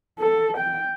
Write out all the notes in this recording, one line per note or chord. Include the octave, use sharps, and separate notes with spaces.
A4
G5